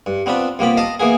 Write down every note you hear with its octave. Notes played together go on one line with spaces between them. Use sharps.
G2
B3 C4 D4 F4 B4
C2 A#3 B3 F4 G4 B5
D#5 F5 A5 A#5
E3 A#3 B3 G#4